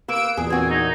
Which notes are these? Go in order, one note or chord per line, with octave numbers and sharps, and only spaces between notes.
A#3 B4 E6 D7
E2 A#2 G#4
C4 F#4 G#5
D#4